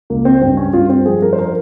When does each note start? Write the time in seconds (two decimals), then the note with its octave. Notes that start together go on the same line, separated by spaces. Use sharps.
0.10 C#2 A#3
0.25 C4
0.41 G2 C4
0.57 C#4
0.73 G2 F4
0.89 C4
1.06 F3 G#4
1.22 A#4
1.33 C5
1.39 A#4